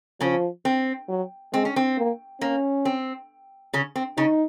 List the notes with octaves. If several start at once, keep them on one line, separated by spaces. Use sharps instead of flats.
C#3 F3 C#4
C4
F#3
G#3 C4
C#4
C4
A#3
A#3 C#4
C4
C#3 C#4
C4
C#3 C#4 D#4